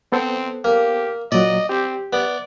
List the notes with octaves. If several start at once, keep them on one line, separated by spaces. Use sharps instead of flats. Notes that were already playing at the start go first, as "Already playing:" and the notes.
B3 C4 A4 C5
A#3 G4
A#2 F#3 D5 D#5
C4 G4
B3 D5